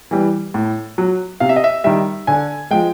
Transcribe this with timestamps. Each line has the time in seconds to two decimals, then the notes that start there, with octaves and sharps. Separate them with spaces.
0.11 E3 G3
0.54 A2
0.98 F#3
1.40 C3 F5
1.49 E5
1.56 D#5
1.64 E5
1.84 D#3 G3 E5
2.27 D3 G#5
2.71 F3 G#3 G5